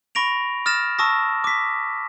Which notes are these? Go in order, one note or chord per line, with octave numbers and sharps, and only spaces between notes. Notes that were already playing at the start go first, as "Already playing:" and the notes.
B5 C#6 A#6 D7 F7
D#6 F6 A6 A#6 E7
A5 C#6 D#6 E6 A#6
D6 B6